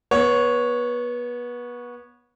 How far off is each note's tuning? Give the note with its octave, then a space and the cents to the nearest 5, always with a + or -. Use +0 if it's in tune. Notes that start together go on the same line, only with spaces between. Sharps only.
B3 -25 C#5 +0